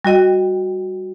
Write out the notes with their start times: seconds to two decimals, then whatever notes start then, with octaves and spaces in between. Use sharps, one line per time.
0.05 G3 F#4 D#5 G5